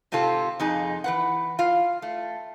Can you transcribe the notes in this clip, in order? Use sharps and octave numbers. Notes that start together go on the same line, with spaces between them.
G#2 C3 C4 F4 A4
F2 D#4 G#4
E3 B4 F#5
F4 F5
A3